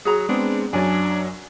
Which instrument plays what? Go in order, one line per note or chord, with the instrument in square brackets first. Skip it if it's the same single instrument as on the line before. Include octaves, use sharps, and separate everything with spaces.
[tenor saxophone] F#3 [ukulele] G#4 A#5
[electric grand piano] G#3 B3 C4 [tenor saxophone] D4
[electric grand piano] F#2 F#3 [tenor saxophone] D4 [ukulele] D5 G#5